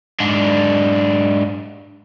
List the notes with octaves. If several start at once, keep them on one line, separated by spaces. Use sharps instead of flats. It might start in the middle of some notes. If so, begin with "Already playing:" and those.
G#2 D4